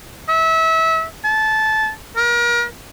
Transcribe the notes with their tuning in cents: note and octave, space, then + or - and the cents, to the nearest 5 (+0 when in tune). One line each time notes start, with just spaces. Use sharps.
E5 -25
A5 -20
A#4 +35